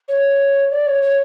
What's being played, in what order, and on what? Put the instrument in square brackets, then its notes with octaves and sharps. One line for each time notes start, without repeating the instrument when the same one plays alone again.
[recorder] C#5
D5
C#5
C#5